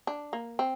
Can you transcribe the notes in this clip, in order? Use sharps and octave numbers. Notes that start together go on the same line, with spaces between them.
D4
A#3
C4